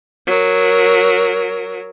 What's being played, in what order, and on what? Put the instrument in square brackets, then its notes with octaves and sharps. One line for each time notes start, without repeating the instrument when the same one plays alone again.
[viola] F#3 A#4